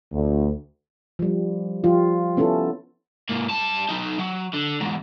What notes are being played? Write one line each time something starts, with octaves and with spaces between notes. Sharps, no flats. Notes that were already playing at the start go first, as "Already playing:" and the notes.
D2
F3 G3
F3 F4 G4
B3 C#4 E4 A4
G#2 A#3
G3 A5
F#3 D#4
F#3
D3
E2 G#2